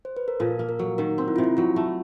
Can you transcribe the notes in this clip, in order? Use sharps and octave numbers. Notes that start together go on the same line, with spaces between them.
C5
B4
A#4
A#2 A4
A#3
A#4
F#3
D#3 A#4
C4
E4
C3 F4
E4
F#3 F4
A3